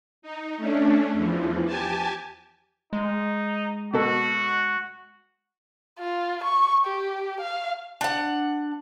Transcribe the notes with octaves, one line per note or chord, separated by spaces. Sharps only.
D#4
A3 C#4 D4
E2 E3 F3
G4 G#5 A5
G#3 D#4
B2 F#4 A4
F4
C#6
G4
F5
D4 F#5